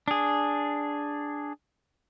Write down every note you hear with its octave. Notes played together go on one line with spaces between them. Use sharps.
D4 G#4